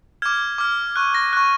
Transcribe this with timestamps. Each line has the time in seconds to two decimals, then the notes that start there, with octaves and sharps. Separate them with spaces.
0.22 D6 F6 G#6
0.58 D6 F6
0.96 C#6 F#6
1.15 A#6
1.33 C#6 F#6